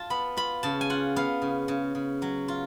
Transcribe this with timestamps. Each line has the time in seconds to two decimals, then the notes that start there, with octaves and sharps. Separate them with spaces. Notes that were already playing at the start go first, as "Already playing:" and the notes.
Already playing: F4 A5
0.10 B3 B5
0.36 F4 B5
0.63 C#3 A5
0.81 G#5
0.90 F4 F#5
1.16 B3 F5
1.42 C#3
1.68 C#3
1.95 C#3
2.22 F#3
2.48 F4